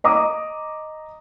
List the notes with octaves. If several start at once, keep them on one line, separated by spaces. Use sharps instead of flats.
D#5 A#5 D6 D#6